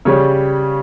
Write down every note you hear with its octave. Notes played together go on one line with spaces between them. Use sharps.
C#3 G3 C#5